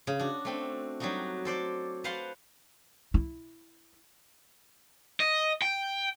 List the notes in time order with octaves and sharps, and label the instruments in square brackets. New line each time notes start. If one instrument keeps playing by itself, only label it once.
[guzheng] C#3
D4 F#4
A3 C4 D4
F#3 G3 D4 D#4 F#4
A4 C5 D5
B4 C5 F5 F#5 A5 C6
[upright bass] E4
[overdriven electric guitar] D#5
G5